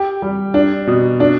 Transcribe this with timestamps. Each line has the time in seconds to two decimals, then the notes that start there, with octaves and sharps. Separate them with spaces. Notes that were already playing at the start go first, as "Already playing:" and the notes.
Already playing: G4
0.22 G3
0.54 D4
0.87 B2
1.20 D4